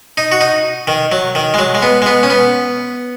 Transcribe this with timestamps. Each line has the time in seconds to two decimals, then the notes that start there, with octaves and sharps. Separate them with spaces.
0.17 D#4
0.32 F#4
0.41 D#4
0.87 D#3
1.12 F#3
1.35 D#3
1.54 G#3
1.59 F#3
1.75 G#3
1.82 B3
2.02 G#3
2.06 B3
2.23 C#4
2.30 B3